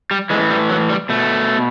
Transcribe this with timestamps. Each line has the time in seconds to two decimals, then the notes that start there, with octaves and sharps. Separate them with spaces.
0.11 G3
0.30 E3 G#3
0.33 A2
0.50 G3
0.70 F#3
0.89 G3
1.09 B2 A3